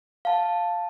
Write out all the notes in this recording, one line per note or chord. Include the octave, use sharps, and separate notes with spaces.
F5 A5